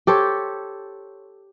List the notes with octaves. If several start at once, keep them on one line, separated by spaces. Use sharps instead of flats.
G4 A4 C5 C#5